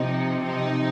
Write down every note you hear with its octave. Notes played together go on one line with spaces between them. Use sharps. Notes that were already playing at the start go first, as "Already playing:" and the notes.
Already playing: C3 F3 D#4
D#4